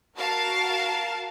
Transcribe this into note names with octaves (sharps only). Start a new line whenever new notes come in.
F#4 A#4 F5 A5